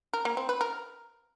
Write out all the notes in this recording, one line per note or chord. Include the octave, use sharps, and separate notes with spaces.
A#4
A#3
C4
B4
A#4